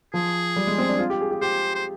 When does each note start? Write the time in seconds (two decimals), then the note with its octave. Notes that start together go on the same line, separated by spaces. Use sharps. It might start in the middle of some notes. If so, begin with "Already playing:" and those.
0.14 F3 G#4
0.56 G3
0.67 G#3
0.78 C4
0.89 D4
0.99 F4
1.10 G4
1.21 G#4
1.31 G4
1.42 G4 C5
1.75 C5